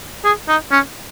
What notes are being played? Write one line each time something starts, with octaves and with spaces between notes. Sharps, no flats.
G#4
D#4
C#4